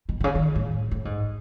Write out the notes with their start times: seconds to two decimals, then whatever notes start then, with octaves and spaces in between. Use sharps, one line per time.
0.09 B2
0.20 B2
0.24 C#3
0.35 D#3
0.55 A2
0.91 A2
1.05 G#2